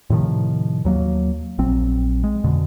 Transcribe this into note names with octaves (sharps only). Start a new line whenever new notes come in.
A2 C3 D#3 F3
D#2 F#3 A#3
A#1 F#3 C4
G#3
F2 B2 D3